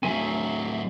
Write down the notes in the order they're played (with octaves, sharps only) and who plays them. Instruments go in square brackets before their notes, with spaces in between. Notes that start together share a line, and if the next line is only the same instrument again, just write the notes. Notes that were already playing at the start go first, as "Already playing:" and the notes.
[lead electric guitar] F#3 C4 [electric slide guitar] A3 E5 G#5